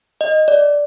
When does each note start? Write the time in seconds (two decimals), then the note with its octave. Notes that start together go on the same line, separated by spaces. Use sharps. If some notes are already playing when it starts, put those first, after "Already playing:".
0.21 D#5
0.48 D5